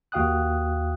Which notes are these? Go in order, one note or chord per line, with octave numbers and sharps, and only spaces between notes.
D#2 F#4 F5 G5 D#6 F#6